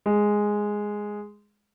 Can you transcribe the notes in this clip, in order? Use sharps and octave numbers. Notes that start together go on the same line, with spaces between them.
G#3